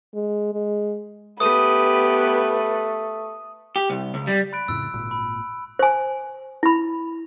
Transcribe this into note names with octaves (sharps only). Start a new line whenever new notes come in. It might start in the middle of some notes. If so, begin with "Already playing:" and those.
G#3
G#3
A3 B3 G4 B4 D#6 D#7
G4
C2
C#2
G3
B5 F#6 D7
F2 A2 C#3 E6
G#1 A#2
B5
C5 G#5
E4 B5